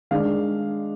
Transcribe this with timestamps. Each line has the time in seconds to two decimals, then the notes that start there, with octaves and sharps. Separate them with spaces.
0.11 D#3 G#3 D4 F5